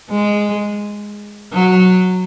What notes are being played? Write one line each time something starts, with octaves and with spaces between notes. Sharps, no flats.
G#3
F#3